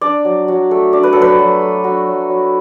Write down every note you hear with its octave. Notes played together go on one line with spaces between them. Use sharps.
D4 D5
F#3
F#3
A3
D4 D5
B4
F#3 A4
B4
F#3
A3
D4 F#4
F#3
F#3